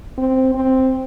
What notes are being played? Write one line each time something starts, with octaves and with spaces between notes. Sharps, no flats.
C4
C4